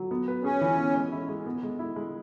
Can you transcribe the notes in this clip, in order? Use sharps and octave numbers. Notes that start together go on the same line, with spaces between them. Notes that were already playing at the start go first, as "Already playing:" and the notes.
Already playing: F#3
B3
B4
C#4 G#4
E3
B3
G#3
E4
G#3
B3
G#3
E4
G#3